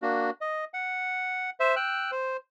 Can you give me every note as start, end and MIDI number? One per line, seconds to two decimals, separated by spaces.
0.02 0.30 58
0.02 0.30 62
0.02 0.30 66
0.41 0.65 75
0.74 1.50 78
1.60 1.75 72
1.60 1.75 76
1.76 2.11 79
1.76 2.11 88
1.76 2.11 90
2.12 2.37 72